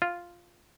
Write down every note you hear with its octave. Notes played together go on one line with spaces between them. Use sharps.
F4